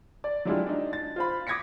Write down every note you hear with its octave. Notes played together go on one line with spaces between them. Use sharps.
D5
F#3 G#3 D4 E4 F4 G4
D4 D#4
A6
F4 C5 B5
D6 D#6 G#6 A#6 B6 C#7